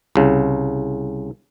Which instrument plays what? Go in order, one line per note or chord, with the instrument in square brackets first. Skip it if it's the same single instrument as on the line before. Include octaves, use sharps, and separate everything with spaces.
[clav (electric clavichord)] C2 C#3